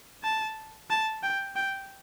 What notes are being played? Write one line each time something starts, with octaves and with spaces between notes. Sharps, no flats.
A5
A5
G5
G5